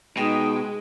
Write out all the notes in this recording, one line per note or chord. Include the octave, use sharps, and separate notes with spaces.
B2 G#3 D#4 G5